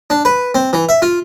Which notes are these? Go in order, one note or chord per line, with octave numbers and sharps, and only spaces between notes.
D4
B4
C4
E3
E5
F4